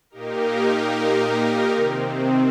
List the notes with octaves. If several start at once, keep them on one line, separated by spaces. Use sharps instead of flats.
A#2 A#3 D#4 G4 A#4
C3 D#3 C4